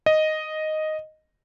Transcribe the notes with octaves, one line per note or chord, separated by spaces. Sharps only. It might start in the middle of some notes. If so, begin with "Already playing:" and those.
D#5